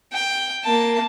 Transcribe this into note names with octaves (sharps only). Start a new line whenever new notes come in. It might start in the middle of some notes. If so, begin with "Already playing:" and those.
G5
A#3 A5